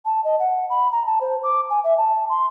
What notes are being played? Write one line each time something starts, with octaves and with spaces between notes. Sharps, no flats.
A5
D#5
F#5
B5
A#5
A5
C5
D6
G#5
E5
A5
C6